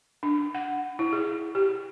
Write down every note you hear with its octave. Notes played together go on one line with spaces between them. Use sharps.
D4
F#5
E4
G#4
G4